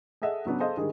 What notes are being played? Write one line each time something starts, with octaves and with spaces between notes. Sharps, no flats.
G#4 A4 D#5 E5 F#5
C#3 F#3 B3 D4
G#4 A4 C5 D#5 F5
D3 D#3 G3 G#3 G#4